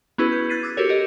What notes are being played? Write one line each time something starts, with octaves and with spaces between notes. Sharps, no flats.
B3 C#4 E4 F#4 G#4 B4
G6
F#6 G#6 A6 B6 C7 D#7
D6 E6 A6
F#4 G4 A4 A#4 C#5
G4 A4 A#4 D#5